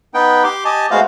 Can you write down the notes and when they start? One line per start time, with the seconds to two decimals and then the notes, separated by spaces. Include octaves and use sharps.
0.14 B3 D#4 B4 G5
0.44 G4 C6 D6
0.65 G4 D#5 G#5 A5
0.91 G#3 A3 B3 F#4 C5 F5